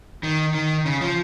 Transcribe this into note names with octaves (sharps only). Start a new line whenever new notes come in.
D#3
D#3
C#3
F3